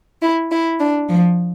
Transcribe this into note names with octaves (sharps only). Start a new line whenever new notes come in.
E4
E4
D4
F3